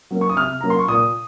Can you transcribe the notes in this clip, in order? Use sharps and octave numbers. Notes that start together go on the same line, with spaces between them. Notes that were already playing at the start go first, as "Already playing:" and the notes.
F#3 A#3 C#4
C#6
D#6
C3 F6
F#3 A#3 C#4 A#5
C6
C#6
A#2 D#6